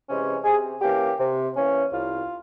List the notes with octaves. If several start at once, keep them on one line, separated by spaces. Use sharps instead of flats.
C3 E3 G#3 C#4
C3 G#4
E3 A#3 C#4 G4
C3
E3 A#3 C#4
C2 F4